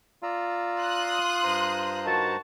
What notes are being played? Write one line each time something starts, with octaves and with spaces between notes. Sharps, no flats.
F4 D5 A#5 E6
C6 D#6 F#6
G2 C5 A#5
D#3 F#4 A5